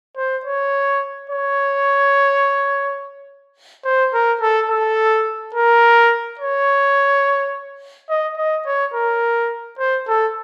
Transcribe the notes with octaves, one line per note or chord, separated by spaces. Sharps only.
C5
C#5
C#5
C5
A#4
A4
A4
A#4
C#5
D#5
D#5
C#5
A#4
C5
A4